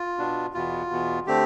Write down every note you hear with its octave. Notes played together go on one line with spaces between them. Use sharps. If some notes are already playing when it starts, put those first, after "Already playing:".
Already playing: F4
B2 B3 D4
E2 B2 B3 F4
E2 B2 B3
D3 A3 C4 G4